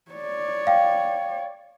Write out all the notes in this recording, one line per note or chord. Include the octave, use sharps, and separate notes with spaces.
C#5 D5
F5 G5